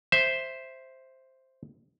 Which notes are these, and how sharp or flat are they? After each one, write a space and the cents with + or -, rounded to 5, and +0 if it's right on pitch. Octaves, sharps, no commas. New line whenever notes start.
C5 +0 E5 +0